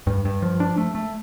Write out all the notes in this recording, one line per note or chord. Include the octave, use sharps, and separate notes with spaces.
G2
G2
F3
D4
A3
A3